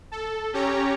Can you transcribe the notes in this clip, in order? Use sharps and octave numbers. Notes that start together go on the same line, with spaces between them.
A4
C#4 G4 C#5 A#5